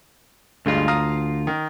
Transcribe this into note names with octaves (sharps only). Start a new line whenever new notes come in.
D2 G2 G#3 F4
F5 A#5 D#6
D#3